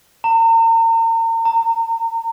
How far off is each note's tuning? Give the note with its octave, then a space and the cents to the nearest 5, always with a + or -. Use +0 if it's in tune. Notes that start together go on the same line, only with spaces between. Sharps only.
A#5 -40
A#5 -25